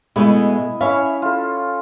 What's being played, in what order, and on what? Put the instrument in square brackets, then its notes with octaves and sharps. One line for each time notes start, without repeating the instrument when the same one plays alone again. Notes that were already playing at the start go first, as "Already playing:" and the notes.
[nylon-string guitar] B2 G#3 A3 [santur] E4 D#5
[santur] C#4 E4 C#5 [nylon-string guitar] E5 F5
[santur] F4 A4